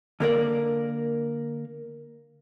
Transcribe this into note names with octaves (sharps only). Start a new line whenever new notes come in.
D3 A#3 A#4 D5